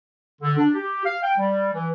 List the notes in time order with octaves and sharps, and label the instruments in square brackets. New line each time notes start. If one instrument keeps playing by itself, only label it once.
[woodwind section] D3
D4
G4
F5
G5
G3
E3